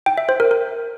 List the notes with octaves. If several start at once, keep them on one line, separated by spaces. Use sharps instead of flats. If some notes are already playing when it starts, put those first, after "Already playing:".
G5
E5
C5
A#4
A#4